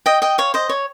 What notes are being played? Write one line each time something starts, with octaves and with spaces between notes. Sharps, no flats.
D#5 G5
D#5 G5
C#5 F5
C5 D#5
C#5